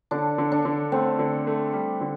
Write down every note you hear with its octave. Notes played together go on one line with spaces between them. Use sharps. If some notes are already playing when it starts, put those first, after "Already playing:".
D3 D4
D3
D4
D3
A3 C4
D3
A3
G3
D3